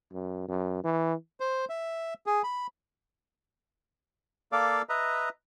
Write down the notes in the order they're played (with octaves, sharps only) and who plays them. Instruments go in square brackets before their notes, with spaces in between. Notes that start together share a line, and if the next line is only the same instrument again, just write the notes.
[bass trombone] F#2
F#2
E3
[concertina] C5
E5
G#4
B5
A#3 A4 D5 F5 D6
B4 D#5 E5 A#5